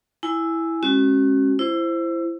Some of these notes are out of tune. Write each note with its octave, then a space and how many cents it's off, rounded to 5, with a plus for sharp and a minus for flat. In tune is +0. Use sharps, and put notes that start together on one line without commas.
E4 +0 G#5 +0
G#3 +0 C#4 -30 F#4 +30
E4 +25 C5 +0